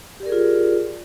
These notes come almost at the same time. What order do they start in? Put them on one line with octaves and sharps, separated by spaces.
G4 D5 A#4 G#4 F4